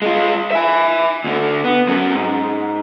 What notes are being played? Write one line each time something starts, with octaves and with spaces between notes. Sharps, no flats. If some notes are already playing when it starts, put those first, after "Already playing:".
G#3 F4
E5 G#5
D2 D3
B3
F#3 C#4
G#2